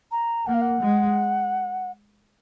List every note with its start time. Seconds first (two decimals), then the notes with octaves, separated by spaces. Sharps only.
0.11 A#5
0.46 A#3 F#5
0.53 F5
0.61 F#5
0.81 G#3